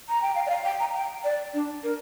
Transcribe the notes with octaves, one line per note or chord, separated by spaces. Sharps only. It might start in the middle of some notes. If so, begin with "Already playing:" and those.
A#5
G5
F5
D5
F5
G5
A#5
G5
D5
D4
A#4